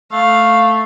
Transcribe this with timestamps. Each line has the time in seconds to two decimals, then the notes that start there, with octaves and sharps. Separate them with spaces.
0.12 A3 F5